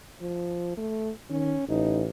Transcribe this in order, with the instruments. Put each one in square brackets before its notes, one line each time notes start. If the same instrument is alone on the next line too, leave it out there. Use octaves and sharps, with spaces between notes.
[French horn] F3
A3
[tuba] D#3 [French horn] C#4
[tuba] A1 [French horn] D#4